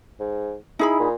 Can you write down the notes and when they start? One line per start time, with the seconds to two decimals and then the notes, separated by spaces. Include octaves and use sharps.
0.20 G#2
0.79 D#4 E4 G#4 B5
0.99 A#2